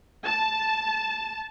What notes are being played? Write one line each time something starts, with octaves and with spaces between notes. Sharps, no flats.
A5